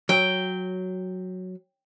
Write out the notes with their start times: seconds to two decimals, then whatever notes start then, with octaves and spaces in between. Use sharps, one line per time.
0.09 F#3 G5